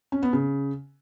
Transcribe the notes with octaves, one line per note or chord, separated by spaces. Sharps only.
C#4
B3
C#3